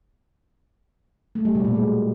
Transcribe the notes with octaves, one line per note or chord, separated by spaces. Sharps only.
A3
G3
B2
A#2
G#3